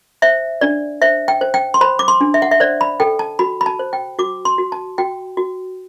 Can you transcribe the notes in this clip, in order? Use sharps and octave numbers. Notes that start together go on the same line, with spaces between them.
C5 E5
D4 D5
C5 E5
G5
C5
G5
C6
C5 B5
D6
C6
D4
E5
F#5
E5
C5 D5
B5
A4 G5
A5
F#4 B5
B5
A5
C5
G5
F#4 D6
C6
F#4
A5
F#4 G5
F#4